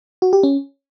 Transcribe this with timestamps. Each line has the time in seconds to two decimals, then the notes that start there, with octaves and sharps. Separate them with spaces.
0.22 F#4
0.33 G4
0.43 C#4